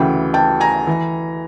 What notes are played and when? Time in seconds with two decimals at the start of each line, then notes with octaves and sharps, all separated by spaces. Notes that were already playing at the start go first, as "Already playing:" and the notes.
Already playing: D2 C#3 E3 G5
0.34 G5 A5
0.60 G#5 A#5
0.87 E3